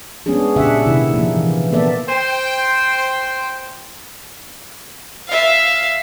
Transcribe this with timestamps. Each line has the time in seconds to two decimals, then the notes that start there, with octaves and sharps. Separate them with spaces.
0.26 G#3 B3 C#4 D4 G#4
0.56 A#2 C#3 D4 G4 E5 F#5
0.86 C3 D#3 E4
1.14 F3 A#3
1.32 E3
1.72 A#3 B3 A4 D5 E5
2.09 C5 G5
5.27 E5 F5